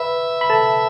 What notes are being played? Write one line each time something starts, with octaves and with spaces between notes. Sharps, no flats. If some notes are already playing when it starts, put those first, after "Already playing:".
Already playing: B4 E5 B5
B5
A4 A5